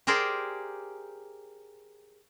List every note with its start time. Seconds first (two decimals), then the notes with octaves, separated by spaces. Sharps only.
0.07 G4 G#4 A#4 C5 D5